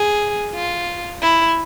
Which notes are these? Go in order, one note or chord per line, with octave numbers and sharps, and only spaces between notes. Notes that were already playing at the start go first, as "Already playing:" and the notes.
Already playing: G#4
F4
E4